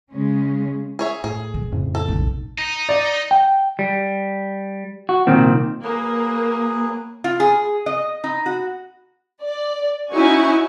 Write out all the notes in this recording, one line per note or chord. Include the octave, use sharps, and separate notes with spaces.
C#3 G#3 C#4
G#4 C#5 E5
A2 G#4
B2
F2 A2 C#3
A4
B1 D#4
D#4
D5
G5
G3
F#4
C2 A#2 D#3 C4
F#3 A#3 G#4 A#4 B4
F4
G#4
D#5
D#4
F#4
D5
C#4 D#4 E4 F#4 G#5 C#6